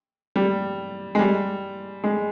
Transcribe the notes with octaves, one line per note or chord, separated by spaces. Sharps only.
G3
G#3
G3
G#3